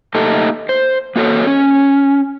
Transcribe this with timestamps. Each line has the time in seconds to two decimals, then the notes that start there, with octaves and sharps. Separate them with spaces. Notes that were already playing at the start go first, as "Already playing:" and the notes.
0.15 A3 A#3 D#4 G4 A4
0.69 C5
1.16 A#3 F#4 A4 C#5
1.47 C#4